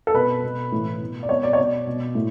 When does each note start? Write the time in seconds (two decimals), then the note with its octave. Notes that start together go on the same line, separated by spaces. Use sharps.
0.07 A4
0.14 B2 B4
0.43 B2
0.72 A2 E3
1.01 B2
1.23 D5
1.29 B2 C#5
1.43 D5
1.53 C#5
1.58 B2 D5
1.87 B2
2.15 A2